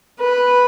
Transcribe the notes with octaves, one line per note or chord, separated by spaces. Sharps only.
B4